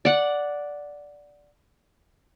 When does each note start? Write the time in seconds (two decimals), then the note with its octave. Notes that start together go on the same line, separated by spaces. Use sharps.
0.05 D5 F#5